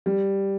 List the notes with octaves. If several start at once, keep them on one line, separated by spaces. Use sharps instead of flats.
G3